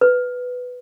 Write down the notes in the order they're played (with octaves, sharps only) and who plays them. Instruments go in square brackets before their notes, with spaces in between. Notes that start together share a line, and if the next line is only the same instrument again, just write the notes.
[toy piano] B4